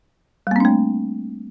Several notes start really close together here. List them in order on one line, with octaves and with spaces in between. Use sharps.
G3 A#3 C4 D4 A3